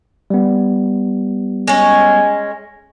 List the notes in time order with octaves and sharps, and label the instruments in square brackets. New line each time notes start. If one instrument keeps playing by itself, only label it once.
[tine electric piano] G3 B3
[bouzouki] G#3 C#4